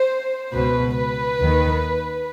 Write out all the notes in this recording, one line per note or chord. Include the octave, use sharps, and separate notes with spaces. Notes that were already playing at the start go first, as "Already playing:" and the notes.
Already playing: C5
C#2 B2 B4
B4
D#2 D#3